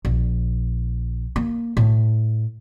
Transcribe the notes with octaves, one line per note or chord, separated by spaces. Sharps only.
A#1
A#3
A2